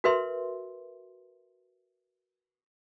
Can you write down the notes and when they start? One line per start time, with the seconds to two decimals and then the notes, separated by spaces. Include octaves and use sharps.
0.04 F#4 A#4 B4 E5 C6